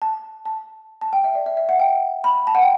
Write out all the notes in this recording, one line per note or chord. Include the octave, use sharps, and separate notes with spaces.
A5
A5
A5
G5
E5
D5
E5
E5
F#5
G5
B5
A5
F#5
G5